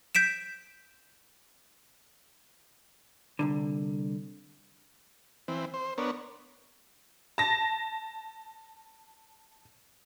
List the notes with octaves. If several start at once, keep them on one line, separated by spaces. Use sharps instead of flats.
G6 B6 D7 E7
C2 G#2 D3
E3 C4
C5
B3 D4 A#4 C#5
A5 A#6